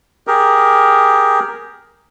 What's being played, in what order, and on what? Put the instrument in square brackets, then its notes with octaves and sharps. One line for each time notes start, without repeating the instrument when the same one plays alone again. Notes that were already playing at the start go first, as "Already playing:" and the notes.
[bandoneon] G4 G#4 A#4